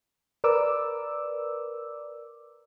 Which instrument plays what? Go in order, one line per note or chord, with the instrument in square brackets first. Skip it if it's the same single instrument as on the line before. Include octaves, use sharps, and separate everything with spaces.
[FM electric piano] A#4 B4 D5 D6 E6